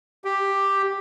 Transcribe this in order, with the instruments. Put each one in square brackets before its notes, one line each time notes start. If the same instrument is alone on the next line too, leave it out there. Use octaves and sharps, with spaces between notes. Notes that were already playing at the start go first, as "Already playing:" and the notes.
[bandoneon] G4